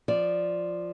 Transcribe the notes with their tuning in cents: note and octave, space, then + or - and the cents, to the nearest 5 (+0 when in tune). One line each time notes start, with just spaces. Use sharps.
F3 +0 D5 +0